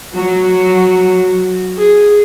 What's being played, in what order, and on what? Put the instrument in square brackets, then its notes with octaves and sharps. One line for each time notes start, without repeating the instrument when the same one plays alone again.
[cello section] F#3 [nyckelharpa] F#4
[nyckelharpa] G#4